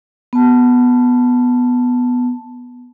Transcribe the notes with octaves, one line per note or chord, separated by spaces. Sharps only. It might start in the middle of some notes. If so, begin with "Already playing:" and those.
B3 A5